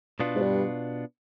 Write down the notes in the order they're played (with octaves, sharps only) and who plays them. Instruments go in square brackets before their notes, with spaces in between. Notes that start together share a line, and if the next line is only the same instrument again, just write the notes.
[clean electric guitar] B2 B3 D4 F4
[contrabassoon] G#2
G2